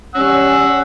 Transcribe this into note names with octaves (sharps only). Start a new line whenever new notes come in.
G3 C#4 F#5 E6